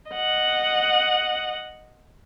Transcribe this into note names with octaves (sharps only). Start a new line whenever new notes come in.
D#5 F#5